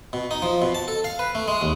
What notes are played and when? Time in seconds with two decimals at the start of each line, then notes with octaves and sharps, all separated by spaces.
0.13 B2
0.31 D#4
0.42 F3
0.62 B2
0.75 A5
0.88 A4
1.04 F5
1.19 B4
1.35 A3
1.48 G#3
1.61 D#2